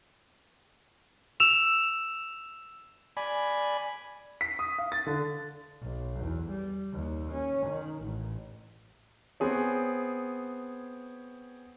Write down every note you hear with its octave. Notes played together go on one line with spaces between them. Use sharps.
E6 E7 F7
D5 G#5 B5
B6
D#6
F5
A6
D3
B1
E2
G3
D#2
C#4
D#3
A1
B3 C4 G#4 C#5